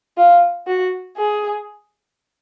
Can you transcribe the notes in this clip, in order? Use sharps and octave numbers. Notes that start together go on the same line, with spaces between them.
F4
F#4
G#4